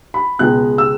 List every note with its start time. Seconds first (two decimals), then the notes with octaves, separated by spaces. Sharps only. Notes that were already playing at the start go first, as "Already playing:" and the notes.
0.14 B5
0.39 C#2 B2 G#3 B3 F#6
0.78 E6